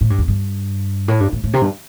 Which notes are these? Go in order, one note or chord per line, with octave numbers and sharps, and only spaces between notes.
A2
G2
E2
G2
A2
G2
A2
A2
C3
G2